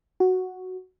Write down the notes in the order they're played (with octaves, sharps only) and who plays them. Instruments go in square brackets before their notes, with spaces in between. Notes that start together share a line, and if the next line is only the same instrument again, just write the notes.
[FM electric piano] F#4